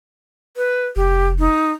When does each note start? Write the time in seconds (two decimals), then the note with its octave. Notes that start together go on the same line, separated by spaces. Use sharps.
0.57 B4
0.96 F1 G4
1.39 D#4